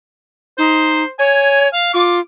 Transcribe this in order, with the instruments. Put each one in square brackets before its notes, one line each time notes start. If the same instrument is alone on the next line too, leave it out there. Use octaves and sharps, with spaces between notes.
[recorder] D#4 [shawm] C5
[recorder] C#5 [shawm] G#5
[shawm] F5
[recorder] F4 [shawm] D6